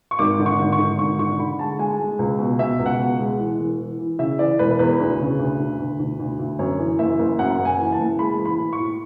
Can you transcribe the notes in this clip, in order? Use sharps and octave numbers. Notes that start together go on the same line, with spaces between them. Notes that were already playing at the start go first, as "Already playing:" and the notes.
C#6
G#1 D6
D3
C#6
G#1
C#6
D3
G#1 C#6
D3 C#6
D3 B5
G#3 A5
G#3 G#5
G#3
C#2
B2
B2 E5
C#2
F#5
B2
G#3
E3
E1
E3
E3
C#3 E5
E3 D5
E1 B4
E2 B4
D2
C#3
D2
D2
D2
D2
D2
D2
F#2 C#5
E3
F#1 E5
F#1
F#2 F#5
F#1
G#5
E3
A5
F#1
G#3 B5
E3
B5
A2
C#6
A2